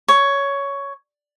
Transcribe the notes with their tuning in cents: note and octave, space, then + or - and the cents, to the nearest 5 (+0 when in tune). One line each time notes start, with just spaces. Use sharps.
C#5 +10